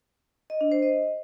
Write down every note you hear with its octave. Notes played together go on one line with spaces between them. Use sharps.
D#5
D4
C5
D#5